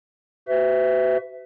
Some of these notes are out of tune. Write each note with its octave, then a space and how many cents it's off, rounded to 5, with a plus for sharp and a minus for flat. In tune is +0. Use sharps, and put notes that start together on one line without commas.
F#4 +35 B4 +40 E5 +0